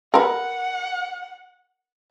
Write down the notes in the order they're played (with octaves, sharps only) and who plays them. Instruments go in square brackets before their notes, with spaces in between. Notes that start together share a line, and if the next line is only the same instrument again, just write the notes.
[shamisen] A#4 B4 [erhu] F#5